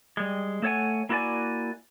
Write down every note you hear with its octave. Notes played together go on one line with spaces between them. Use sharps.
G3 G#3
A3 A4 C#5 F#5 G#5
A#3 E4 F#4 A#4 D5 G#5